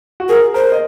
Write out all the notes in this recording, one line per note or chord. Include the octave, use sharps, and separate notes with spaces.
F#4
G#4 A#4
A#4 C5
D#5